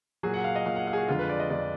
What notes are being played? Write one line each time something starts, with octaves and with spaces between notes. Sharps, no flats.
A#2 F#3 G#4
F#5
F5
D#5
A#2 F#3 F5
F#5
F5
G#4
F#4
F2 D3 G#3 F4
B4
D5
D#5
F2 D3 G#3 D5